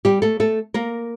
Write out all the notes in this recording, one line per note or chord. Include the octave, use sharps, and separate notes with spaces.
G3 G4
A3 A4
A3 A4
A#3 A#4